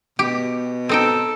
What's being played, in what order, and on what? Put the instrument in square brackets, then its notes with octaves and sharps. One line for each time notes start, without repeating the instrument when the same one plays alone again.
[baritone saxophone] B2 [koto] G4
[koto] C4 D#4 G5 [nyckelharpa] A4